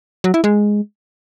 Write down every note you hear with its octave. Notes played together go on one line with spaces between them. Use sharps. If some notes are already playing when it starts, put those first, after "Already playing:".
F#3
E4
G#3